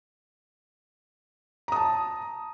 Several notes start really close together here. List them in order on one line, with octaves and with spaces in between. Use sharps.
A#5 D#6 A5